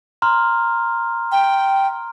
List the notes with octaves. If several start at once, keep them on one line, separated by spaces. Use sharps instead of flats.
A#5 C6 F6
G5